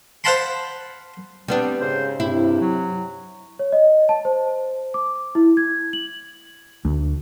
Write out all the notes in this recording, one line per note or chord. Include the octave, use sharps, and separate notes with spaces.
C5 F5 F#5 A5 B5 C6
G3 B3 C4 D4
G#2 C#3 C5
G2 C3 E4
F#3
C#5
D#5
A5
C5
D6
E4
G#6
F#7
D2